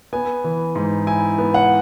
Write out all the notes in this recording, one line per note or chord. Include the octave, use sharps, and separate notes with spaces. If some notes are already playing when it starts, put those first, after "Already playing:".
B3 G#5
E3
G#2
E4 G#5
B3
F#5